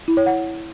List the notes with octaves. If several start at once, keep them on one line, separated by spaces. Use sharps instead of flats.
E4
C#5
F#5